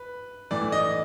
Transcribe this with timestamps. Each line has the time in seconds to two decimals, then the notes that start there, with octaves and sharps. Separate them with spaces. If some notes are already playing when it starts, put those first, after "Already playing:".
Already playing: B4
0.51 A2 E3 D5
0.72 D#5